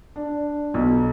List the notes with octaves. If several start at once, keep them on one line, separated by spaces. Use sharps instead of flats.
D4
B1